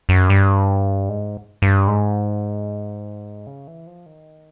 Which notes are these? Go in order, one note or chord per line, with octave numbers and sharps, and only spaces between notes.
F#2
G2
G#2
G2
G#2
C#3
E3
F3
D#3